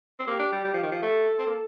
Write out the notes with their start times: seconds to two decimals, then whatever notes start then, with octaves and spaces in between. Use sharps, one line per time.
0.19 C4
0.27 A#3 G4
0.39 D4
0.52 G3
0.64 G3
0.74 F3
0.83 D#3
0.92 F3
1.02 A3 A4
1.39 C4
1.47 A#3